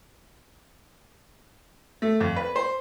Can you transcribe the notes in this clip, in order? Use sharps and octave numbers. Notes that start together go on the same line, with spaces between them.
A3
F2
B4
C5